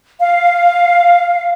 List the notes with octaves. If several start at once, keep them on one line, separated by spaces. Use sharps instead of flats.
F5